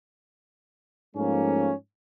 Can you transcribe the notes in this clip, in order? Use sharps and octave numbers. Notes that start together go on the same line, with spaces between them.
G#2 F3 A3 A#3 C#4